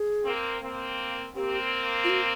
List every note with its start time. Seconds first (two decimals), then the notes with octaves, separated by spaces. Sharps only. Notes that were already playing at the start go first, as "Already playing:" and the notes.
Already playing: G#4
0.24 A#3 C4
0.61 A#3 C4
1.35 A#3 C4 G4
2.04 F4
2.10 F#4